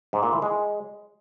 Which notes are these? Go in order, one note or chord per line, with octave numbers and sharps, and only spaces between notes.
G#2
A#2
E3
G#3